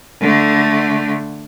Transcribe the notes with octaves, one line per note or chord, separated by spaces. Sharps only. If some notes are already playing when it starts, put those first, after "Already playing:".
D3 A3